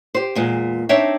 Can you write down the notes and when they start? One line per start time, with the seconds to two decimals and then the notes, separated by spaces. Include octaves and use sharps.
0.15 G4 C5
0.35 E2 A#2 G#3
0.89 C4 D4 D#4 C#5 E5